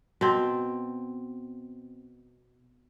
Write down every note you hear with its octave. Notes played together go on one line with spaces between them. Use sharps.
B2 C4